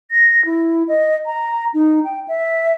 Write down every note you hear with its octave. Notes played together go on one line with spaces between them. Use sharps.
A#6
E4
D#5
A#5
D#4
G5
E5